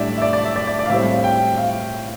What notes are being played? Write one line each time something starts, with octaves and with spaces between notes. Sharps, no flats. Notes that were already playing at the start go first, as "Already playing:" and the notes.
Already playing: A2 G3 D4 D5 E5
E5
D5
D5
E5
D5
D5
D5
F5
A2 G3 C4 E5
F5
F5
G5
F5